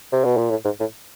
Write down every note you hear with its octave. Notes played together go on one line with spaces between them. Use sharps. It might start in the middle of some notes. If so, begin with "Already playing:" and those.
C3
B2
A#2
A2
G#2
A2